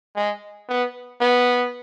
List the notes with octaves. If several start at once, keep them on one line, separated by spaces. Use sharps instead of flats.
G#3
B3
B3